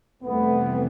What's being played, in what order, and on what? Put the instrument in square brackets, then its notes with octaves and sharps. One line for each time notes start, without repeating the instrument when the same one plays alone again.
[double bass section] F2 C3 E3 G3 C4 [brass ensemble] A3 B3